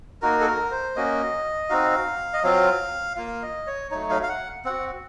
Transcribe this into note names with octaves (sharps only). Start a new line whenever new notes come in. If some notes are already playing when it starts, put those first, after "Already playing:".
A#3 D#4 F#4 A#4
A4
A#4
C5
A#3 C#4 F#4 D#5
C4 D#4 F#4 F5
D#5
F#3 C4 F4 F5
A#3 F4 F5
D#5
C#5
F#3 A3 D#4 C#5
F5
F5
F#5
C4 F#4 F#5